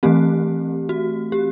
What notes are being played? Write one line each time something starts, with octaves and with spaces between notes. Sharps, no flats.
E3 A3 C4 G4
F#4
G4